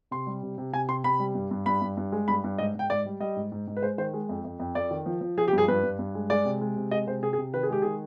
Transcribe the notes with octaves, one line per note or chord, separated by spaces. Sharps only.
C3 C6
G3
C3
C3
C3 G#5
C3 C6
C3 B5
G3
G2
G2
G2 B5
G2
G2
G#3
G2 B5
G2
G#2 D#5
G#2 G5
G#2 D5
G3
G3 D#5
G#2
G#2
G#2
B4
G#3 C5
D#3 C5
G#3
F2
F2
F2
F2 D5
D#3
F3
F3
F3 G#4
G4
G2 G#4
G2 B4
G2
G2
G#3
G#3 D5
C3
G#3
C3
G#3 D#5
C3 C5
C3 G#4
G#4
C3
D#3 B4
G#4
G#3 G4
D#3 G#4